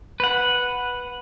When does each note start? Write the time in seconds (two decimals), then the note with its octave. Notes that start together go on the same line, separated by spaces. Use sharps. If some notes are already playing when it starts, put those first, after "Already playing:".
0.20 B4 F#5